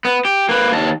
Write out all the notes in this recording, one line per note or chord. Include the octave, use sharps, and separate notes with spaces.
B3
G4
A#3 B4
D#2 A5